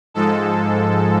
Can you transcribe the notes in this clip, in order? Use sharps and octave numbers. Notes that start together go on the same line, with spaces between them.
G#2 F3 G#3 A4